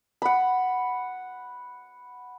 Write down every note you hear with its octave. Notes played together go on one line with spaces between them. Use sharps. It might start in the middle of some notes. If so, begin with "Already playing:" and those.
F#5 B5